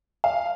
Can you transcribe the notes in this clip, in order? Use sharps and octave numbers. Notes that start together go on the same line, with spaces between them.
F5